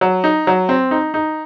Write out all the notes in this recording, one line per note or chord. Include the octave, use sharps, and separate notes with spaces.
F#3
D#4
F#3
C4
D#4
D#4